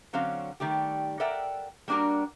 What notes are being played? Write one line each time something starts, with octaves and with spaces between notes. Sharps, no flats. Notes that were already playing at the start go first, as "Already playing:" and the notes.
D3 F#3 C4 C#4 F5
D#3 G3 A3 G4
A4 A#4 D5 E5 F#5 G5
G3 A#3 D4 F#4 A#4